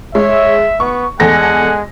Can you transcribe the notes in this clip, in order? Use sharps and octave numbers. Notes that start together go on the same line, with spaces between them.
G#3 C#5 E5
B3 C#6
E2 G#3 A4 F#5 G#5 A#6